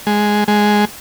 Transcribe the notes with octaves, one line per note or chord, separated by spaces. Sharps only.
G#3
G#3